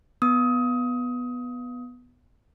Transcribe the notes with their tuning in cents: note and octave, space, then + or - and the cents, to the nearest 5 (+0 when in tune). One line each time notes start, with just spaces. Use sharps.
B3 +0 D#6 +20